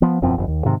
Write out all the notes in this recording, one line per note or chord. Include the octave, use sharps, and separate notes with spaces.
F3 B3
E1 F#2 F3 C4
G1 F2
D#2
G#2 C3 D#3